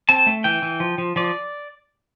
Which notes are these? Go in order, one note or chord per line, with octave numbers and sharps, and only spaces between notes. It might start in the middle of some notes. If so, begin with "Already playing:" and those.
C4 A5
A3
E3 G5
E3
F3
F3
F3 D5